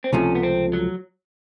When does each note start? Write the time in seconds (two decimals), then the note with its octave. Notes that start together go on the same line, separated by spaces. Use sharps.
0.04 C4
0.13 C#2 C3 F3 A3 C#4
0.35 B3
0.43 C4
0.73 F#3